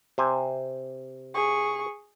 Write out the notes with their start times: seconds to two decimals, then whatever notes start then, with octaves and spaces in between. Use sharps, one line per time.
0.18 C3 C5 G#5
1.34 G#4 C#6